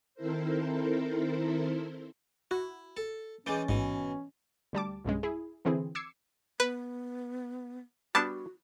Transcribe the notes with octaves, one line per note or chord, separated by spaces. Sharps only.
D#3 C4 E4 A4 A#4 C5
E4 F#4
A4
E3 G#3 C#4 D6 G6 A6
A1 G#2 B2 E3
D2 G3 A5 D6
B1 G2 C#3 G#3
E4 G#4
D3 E3 C4 E4 G#4
D6 E6 G#6 C7 C#7
B3 B4
G3 B3 D4 F#4 A5